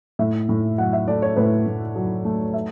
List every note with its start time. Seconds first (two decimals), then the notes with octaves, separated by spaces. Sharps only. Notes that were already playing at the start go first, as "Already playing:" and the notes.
0.19 A2 E5
0.49 A2
0.78 F#3 F#5
0.93 E5
1.08 A3 D5
1.22 C#5
1.36 A2 B4
1.67 A2
1.96 F#3
2.25 A3
2.53 E5